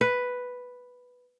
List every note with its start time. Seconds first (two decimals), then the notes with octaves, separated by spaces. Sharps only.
0.01 B4